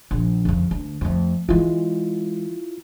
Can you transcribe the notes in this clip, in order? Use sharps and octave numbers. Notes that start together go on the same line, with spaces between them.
A#1
F2 C#3
D2
F2 A3
E3 G#3 E4 F4